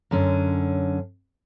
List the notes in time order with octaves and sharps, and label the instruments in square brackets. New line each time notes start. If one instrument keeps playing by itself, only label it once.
[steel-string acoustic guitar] F#2 D3 C#4